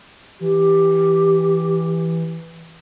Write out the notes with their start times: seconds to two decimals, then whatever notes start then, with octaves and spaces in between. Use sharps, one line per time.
0.40 E3 G4